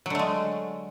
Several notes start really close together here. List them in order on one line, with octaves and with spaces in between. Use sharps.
F#3 D3 A3 G#3